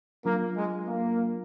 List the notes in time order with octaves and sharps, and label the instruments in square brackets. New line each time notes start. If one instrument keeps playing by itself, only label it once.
[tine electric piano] F#3 D4 F4 [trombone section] A#3
[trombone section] G#3
A#3